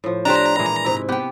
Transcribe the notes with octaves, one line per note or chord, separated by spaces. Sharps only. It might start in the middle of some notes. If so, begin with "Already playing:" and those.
A2 F3
D4 G4 C5 A#5
A#2 E3 G#3
G#2 C3 E4
B3 G4 G5